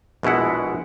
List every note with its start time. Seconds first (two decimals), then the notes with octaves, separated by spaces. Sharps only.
0.23 A#1 B2 G#3 E4 F#5